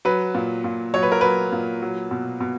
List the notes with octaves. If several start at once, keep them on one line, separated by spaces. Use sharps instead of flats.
F#3 B4
A#2
A#2
F#3 C#5
B4
A#4
F#3 B4
A#2
F#3
B2
B2